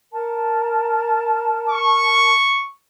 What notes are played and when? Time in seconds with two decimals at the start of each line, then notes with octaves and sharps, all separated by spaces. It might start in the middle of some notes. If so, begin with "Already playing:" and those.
0.13 A#4 A5
1.69 C#6